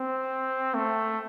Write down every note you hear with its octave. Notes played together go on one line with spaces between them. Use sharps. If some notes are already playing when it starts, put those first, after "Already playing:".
Already playing: C4
A3